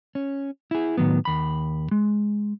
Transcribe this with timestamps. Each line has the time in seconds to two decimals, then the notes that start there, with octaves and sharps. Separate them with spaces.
0.15 C#4
0.71 E4 G#4
0.97 A2 D#3 F#3 B3
1.25 D#2 B5
1.91 G#3